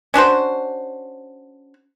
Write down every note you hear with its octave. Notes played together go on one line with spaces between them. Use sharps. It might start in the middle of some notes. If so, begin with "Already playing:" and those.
C#4 D4 F#4 C5